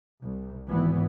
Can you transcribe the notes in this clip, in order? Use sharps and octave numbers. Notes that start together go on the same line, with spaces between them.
C2
G#1 E3 B3